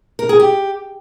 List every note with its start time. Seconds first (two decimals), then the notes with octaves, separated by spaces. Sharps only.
0.19 A#4
0.29 G#4
0.40 G4